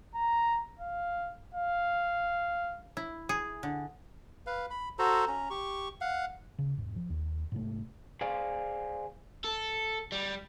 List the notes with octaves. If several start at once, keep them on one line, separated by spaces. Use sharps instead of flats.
A#5
F5
F5
E4
G#4
D3
B4 F5
B5
F#4 A4 C5 A#5
C#4 A#5
G4 C#6
F5 F#5
C#3
E1 G#2
F3
D#2
G#2 C3 A3
G#4 C5 D5 F5
A4
G3